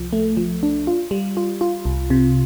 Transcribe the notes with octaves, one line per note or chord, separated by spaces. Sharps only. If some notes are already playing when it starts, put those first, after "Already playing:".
Already playing: C2 F3
A3
F3
D4
F4
G3
F4
F4
C2
C3